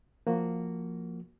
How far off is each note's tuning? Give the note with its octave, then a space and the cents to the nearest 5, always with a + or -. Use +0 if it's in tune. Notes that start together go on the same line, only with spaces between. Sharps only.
F3 +0 A#3 -10 F#4 +0